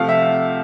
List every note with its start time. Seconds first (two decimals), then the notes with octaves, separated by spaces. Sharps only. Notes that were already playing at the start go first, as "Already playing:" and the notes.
Already playing: C3 F3 A3 F5 F#5
0.09 E5